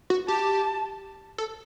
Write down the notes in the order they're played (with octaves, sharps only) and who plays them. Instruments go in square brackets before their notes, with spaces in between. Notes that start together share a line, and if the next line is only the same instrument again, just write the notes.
[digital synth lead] F#4
[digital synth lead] G4 [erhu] A5
[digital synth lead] A4